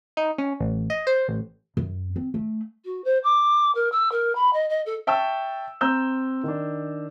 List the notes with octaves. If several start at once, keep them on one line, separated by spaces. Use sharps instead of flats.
D#4
C#4
A1
D#5
C5
A1
F#2
C4
A3
F#4
C5
D6
A#4
E6
A#4
B5
D#5
D#5
A4
E5 G5 A5 C#6 E6
C4 A#5 E6 G6 G7
D#3 D4